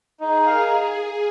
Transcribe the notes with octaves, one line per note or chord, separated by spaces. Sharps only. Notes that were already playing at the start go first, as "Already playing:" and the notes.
D#4 G#4
A#4 F5